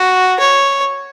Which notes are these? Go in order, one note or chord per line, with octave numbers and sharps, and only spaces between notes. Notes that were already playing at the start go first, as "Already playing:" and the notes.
Already playing: F#4
C#5